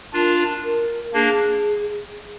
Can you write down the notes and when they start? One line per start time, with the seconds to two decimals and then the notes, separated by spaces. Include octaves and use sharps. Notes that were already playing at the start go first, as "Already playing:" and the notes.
0.13 D4 F4 A#4
0.63 A#4
1.14 A#3 D4 G#4